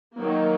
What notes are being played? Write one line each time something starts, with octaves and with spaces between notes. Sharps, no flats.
D#3 F#3 A#3